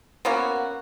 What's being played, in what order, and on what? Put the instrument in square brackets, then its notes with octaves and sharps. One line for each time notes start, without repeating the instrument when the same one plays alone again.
[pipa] A#3 B3 C#4 F#4